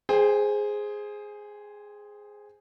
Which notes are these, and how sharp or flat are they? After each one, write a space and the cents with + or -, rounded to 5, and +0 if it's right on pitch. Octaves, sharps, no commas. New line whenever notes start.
G#4 +0 C5 +0 G5 +35